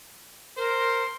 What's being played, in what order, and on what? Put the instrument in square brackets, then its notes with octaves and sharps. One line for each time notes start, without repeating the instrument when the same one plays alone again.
[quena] A#4 [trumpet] C5